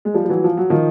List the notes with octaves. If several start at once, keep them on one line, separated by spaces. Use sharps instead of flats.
G#3
F3 G3
G3
E3 F#3
F3
F#3
D#3 F3